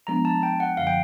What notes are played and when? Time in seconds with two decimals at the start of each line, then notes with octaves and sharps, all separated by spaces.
0.07 F3 G#3 B3 D4 A#5
0.25 A5
0.43 G5
0.60 F#5
0.77 F#2 D3 F3 F5
0.87 G5